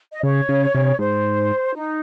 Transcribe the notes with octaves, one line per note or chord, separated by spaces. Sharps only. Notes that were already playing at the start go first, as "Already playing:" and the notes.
D#5
C#3 C#5
C#3
C3
G#2 C5
D#4